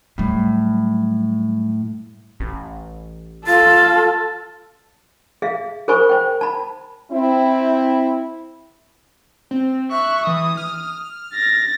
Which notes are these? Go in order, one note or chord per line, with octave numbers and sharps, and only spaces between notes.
A2 F#3 G3
A1
F4 A4 A5
G#4 E5 F5
G#4 A#4 C5 G#5 B5 C#6
C5 G5
A5 B5
C4 E4
C4
E5 C#6 F#6
E3 D#6
F6
A6 A#6